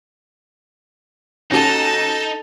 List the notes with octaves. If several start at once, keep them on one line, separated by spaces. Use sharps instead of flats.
D#2 C#4 D#4 F#4 A4 A5